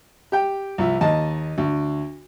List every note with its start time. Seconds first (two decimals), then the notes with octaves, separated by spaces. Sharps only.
0.32 G4 G5
0.78 C2 F3 E5
1.01 D#2 D#5 A5
1.58 D2